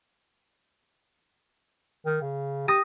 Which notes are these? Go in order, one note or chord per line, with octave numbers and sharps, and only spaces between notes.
D#3
C#3
G4 D#6 A#6 D#7